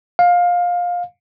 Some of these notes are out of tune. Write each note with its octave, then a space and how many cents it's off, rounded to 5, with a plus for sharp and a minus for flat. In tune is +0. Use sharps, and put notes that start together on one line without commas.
F5 +20